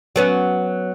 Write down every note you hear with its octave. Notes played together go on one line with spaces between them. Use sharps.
F#3 B3 C#4